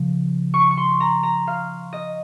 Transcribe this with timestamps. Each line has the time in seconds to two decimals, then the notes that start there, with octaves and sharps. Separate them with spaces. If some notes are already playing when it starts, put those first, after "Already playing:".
Already playing: C#3 F3
0.54 C#6
0.71 C#6
0.77 C6
1.00 A#5
1.23 A#5
1.47 F5
1.93 D#5